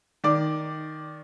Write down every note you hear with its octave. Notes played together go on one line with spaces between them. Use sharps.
D#3 D5 D6